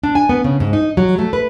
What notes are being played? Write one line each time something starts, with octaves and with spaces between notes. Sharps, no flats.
D4
G#5
B3
C#3
G#2
D#4
F#3
A3
B4